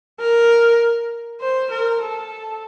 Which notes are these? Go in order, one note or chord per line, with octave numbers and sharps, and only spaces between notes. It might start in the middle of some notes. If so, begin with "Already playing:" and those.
A#4
C5
A#4
A4